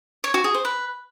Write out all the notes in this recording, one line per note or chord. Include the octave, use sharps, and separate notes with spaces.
C#5
F#4
G#4
C5
B4